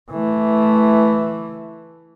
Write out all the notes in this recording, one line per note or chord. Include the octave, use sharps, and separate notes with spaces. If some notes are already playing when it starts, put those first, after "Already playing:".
E3 A3